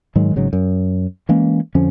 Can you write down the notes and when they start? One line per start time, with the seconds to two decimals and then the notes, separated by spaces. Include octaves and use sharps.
0.15 G#2 D#3 F#3 G#3
0.36 G#1 G#2 C#3 F#3
0.53 F#2
1.29 E3 G#3 A#3 C#4
1.75 F2 D3 F3 C#4